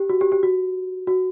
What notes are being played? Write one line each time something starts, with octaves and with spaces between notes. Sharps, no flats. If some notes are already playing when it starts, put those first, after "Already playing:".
Already playing: G4
F#4
G4
G4
F#4
F#4